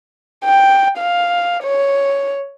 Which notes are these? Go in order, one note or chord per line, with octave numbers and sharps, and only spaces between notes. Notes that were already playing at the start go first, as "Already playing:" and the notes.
G5
F5
C#5